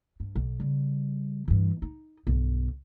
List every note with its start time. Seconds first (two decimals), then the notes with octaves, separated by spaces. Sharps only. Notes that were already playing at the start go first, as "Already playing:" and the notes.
0.20 G2
0.35 B1
0.60 C#3 G3
1.48 G2 E3
1.82 D#4
2.27 B1 G2